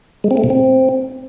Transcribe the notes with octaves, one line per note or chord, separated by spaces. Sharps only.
G#3
C4
A3
B2
C4